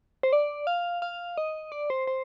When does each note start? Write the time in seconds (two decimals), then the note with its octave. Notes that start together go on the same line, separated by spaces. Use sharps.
0.23 C5
0.33 D5
0.67 F5
1.02 F5
1.38 D#5
1.72 D5
1.90 C5
2.07 C5